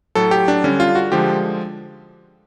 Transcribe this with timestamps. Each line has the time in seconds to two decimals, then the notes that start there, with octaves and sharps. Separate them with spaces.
0.15 A2 F#3 A4
0.31 G4
0.48 D4
0.64 D3 G3 C#4
0.80 F4
0.95 F#4
1.12 D3 F3 G#3 G4